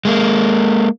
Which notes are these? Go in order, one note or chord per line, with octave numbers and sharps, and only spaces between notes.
G#3 A#3